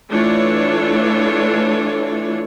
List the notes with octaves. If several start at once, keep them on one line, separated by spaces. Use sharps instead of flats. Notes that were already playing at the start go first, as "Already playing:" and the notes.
E3 A3 D4 F4 A4 C#5